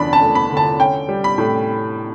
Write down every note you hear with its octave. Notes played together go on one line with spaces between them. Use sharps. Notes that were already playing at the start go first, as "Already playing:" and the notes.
Already playing: E2 D3 D4 B5
A5
A3
B5
D3
A5
C#4 G5
G3
B5
A2